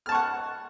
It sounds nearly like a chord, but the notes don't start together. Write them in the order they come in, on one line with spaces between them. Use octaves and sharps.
F6 A5 C#6 F#5